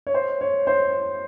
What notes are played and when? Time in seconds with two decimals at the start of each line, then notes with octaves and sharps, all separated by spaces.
0.07 C#5
0.14 C5
0.41 C#5
0.67 C5